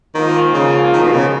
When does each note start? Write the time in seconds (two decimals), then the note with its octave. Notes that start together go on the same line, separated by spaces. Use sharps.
0.15 G#2 D#3 F3 A#3 F4
0.54 C#3
0.93 D#3
1.03 B2
1.13 C#3